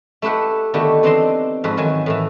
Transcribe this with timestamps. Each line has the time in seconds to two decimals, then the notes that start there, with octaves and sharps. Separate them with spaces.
0.22 A3 E4 G4 B4 F#5
0.74 D3 D#3 A3 B3 F#4 G4
1.03 E3 C4 D4 D#4 D#5 C6
1.64 F2 G#2 F#4 G#4 B4
1.77 D#3 E3 F#3 G#5
2.06 A2 D#3 E3